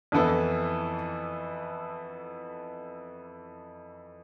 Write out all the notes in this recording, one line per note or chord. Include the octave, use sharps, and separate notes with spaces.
F2 E3 B3 E4 A4